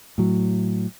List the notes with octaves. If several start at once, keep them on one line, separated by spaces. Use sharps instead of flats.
A2 F#3